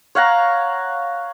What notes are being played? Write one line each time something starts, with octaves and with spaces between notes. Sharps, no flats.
C#5 F5 F#5 A#5